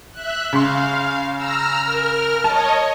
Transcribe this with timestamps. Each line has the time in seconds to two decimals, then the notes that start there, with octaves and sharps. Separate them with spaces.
0.13 E5 F#6
0.53 C#3 F5 C6
1.35 A#5 E6 F6
1.84 A#4 F6
2.44 C#5 D#5 A5